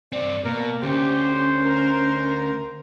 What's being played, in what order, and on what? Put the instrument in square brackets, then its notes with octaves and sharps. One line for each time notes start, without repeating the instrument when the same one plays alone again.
[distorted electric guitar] G2 C4 [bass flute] D5
[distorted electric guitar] B2 [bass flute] A#3 [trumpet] A#4
[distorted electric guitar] D2 [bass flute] C#4 [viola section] G4 [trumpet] C5
[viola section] A#4